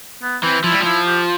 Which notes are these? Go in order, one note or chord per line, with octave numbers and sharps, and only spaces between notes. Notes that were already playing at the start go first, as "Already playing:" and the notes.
B3
E3 C4
F3 E4
G3
F3
E4
G4